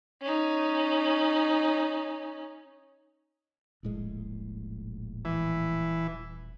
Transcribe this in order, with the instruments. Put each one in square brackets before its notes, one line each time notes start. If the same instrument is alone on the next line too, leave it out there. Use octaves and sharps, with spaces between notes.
[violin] C#4 D#4
[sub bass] D#1 [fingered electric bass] A#1 A2 G#3
[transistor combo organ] E3